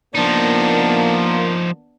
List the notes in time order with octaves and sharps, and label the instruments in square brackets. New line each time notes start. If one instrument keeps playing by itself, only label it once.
[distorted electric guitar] F3 D#4 [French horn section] A#3 [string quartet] B3 D4